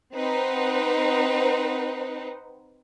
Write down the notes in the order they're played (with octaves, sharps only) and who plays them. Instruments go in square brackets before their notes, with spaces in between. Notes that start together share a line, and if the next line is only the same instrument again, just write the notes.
[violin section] C4 D#4 B4 C5 F#5